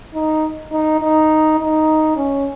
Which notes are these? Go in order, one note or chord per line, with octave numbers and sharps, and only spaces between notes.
D#4
D#4
D#4
D#4
C#4